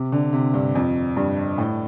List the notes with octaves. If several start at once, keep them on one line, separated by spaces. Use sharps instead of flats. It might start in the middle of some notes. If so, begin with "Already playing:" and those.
Already playing: C3
D3
C3
G2
F2
G2
A2